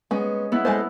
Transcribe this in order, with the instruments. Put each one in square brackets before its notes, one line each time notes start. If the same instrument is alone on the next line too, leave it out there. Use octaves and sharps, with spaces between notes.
[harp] G#3 C#4 [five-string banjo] B3
[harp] B3 E4
[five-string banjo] G#3 A4 C5